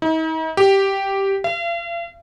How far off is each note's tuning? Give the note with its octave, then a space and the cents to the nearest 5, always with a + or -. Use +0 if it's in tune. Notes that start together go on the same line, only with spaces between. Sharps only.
D#4 +45
G4 -5
F5 -45